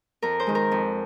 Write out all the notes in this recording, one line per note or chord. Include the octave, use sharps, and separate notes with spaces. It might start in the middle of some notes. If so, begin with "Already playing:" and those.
F2 A#4
C5
D#3 G#3
A#4
F2